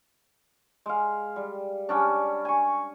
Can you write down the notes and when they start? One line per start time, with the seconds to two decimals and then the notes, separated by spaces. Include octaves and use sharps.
0.86 G#3 F5
1.36 G3
1.89 G3 C#4 D4
2.45 G#5 C#6